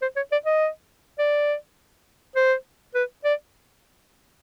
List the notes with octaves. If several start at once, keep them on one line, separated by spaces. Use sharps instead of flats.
C5
C#5
D5
D#5
D5
C5
B4
D5